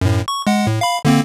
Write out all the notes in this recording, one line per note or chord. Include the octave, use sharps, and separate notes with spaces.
F#2 A2
C#6
G#3 F#5
A2
F5 B5
D3 A#3 C4